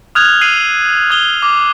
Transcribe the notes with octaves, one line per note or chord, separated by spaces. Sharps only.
D#6 F6 F#6 G#6 F7
E6 C7 D#7 F#7
D#6 G#6 G7
D6